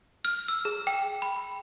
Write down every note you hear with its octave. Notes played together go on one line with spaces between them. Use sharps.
F6
E6
G#4
G5
B5